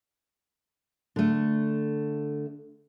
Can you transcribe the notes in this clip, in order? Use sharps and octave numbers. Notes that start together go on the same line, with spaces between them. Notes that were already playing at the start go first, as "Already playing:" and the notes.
D3 A3